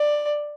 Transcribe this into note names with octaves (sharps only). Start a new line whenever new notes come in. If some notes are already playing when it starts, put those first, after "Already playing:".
Already playing: D5